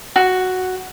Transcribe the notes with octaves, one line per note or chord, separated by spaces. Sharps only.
F#4